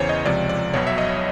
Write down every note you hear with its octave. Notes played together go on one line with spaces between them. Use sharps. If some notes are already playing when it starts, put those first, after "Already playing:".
Already playing: E2 C#3 E3 C5 C#5
D#5
C#2 C3 F3 D5
D5
B1 B2 F#3 C#5
E5
D#5